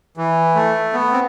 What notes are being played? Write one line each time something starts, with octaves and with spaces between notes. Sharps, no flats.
E3
A3
B3
C4